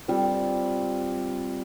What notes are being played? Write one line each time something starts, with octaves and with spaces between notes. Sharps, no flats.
G3 C4 F4